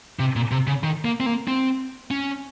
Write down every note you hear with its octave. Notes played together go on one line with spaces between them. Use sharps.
C3
A#2
C3
C#3
D#3
A#3
C4
A#3
C4
C#4